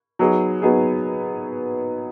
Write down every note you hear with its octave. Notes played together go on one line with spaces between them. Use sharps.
F#3 B3 D#4 G#4
F#3 B3 D#4 G#4